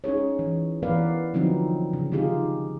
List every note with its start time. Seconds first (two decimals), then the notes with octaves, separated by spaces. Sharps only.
0.04 C#4 D#4 G#4 C#5
0.39 E3
0.83 E3 B3 A#4 B4 D5 F5
1.34 D3 F3 F#3 C4 D#4
1.93 C#3
2.12 D#3 C4 D#4 F4 G4 G#4